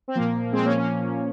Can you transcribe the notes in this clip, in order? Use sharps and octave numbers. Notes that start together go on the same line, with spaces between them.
C4
A#2 F3 A#3
G#3 C4
A#3 C#4
A#3 C#4